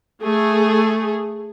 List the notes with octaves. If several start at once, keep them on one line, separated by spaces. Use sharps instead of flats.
A3 G#4